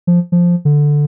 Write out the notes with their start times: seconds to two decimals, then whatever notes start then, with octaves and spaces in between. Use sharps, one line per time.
0.07 F3
0.32 F3
0.65 D3